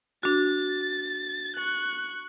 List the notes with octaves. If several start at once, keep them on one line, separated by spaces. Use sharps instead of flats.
D4 F#4 A6
C#6 F#6